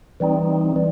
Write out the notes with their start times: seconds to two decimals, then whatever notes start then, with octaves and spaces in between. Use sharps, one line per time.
0.20 E3 G3 C4 D#4
0.76 E3 G3